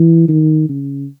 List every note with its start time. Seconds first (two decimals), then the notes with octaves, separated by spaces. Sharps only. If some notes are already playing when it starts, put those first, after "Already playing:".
Already playing: E3
0.29 D#3
0.69 C#3